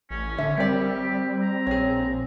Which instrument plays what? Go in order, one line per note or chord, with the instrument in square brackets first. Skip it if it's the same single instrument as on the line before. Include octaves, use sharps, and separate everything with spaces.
[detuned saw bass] A1 [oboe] C#4
[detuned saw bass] D3 [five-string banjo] E5
[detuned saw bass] G3 [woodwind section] C4 [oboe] G4 [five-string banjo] A#4 D5
[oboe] A#5
[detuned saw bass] A#1 [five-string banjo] G#4 C#5